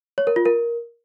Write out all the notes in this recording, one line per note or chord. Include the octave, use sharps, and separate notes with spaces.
C#5
A#4
F4
A#4